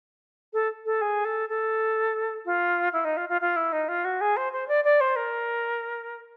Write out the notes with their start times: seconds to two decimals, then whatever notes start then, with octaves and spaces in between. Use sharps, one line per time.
0.53 A4
0.86 A4
1.01 G#4
1.25 A4
1.49 A4
2.45 F4
2.93 E4
3.05 D#4
3.17 F4
3.29 F4
3.41 F4
3.56 E4
3.73 D#4
3.88 F4
4.05 F#4
4.21 G#4
4.37 C5
4.53 C5
4.68 D5
4.84 D5
5.01 C5
5.16 A#4